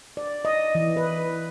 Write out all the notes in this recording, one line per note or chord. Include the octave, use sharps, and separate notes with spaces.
D5
D#5
E3
B4